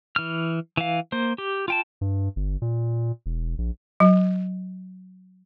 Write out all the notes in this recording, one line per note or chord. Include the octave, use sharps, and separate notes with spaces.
E3 F6
E3 F5
A#3 C5
G4
F4 G5 A5
G2
G1
A#2
E1
A#1
F#3